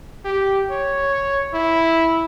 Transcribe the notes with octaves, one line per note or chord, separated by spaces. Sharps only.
G4
C#5
E4